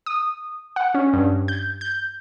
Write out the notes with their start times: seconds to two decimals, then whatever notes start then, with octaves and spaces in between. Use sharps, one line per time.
0.06 D#6
0.76 F#5
0.95 C#4
1.13 G2
1.48 G6
1.81 G6